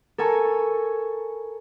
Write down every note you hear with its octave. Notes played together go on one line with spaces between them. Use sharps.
A4 A#4 G#5 C#6